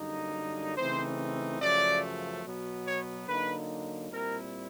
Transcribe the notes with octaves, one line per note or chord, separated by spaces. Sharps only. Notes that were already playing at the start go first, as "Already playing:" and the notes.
Already playing: F#2 D3 G3 A#3 D#4
C#3 E3 A3 C4 D#4 C5
F#2 C#3 F3 A3 D5
B2 F#3 B3
C#5
D3 F#3 A#3 D#4 B4
A#2 G3 C4 E4 A#4